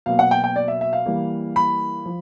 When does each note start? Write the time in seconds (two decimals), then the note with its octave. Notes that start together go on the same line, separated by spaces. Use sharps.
0.06 B2 F#3 A#3 F5
0.19 F#5
0.31 G5
0.44 G5
0.56 D5
0.68 E5
0.81 E5
0.93 F5
1.06 E3 G3 A#3
1.56 B5
2.06 F3